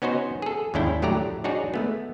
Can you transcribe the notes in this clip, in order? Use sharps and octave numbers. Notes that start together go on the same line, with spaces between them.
B3 C#4 D#4 F#4 C5
G#4 A4
D#2 G#2 C#4 D4 E4 G5
A2 F#3 A3 G4 D5 A#5
D4 D#4 F#4 G#4 C#5 D5
G#3 A3 B3